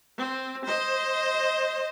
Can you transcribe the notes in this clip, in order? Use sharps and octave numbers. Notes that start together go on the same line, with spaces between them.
C4
C5 D#5